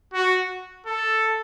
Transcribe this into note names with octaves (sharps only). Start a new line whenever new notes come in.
F#4
A4